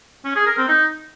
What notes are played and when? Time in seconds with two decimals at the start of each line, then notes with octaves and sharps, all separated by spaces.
0.25 C#4
0.36 G#4
0.47 A#4
0.58 C4
0.68 D#4